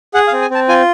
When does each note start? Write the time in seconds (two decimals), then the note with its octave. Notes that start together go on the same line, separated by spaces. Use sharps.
0.14 G#4 F#5
0.28 F5
0.33 C4
0.42 G#5
0.50 C4 A5
0.69 F4 G#5